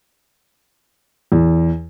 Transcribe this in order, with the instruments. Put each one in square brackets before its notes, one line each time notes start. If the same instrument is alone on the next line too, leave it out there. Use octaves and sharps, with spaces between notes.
[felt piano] E2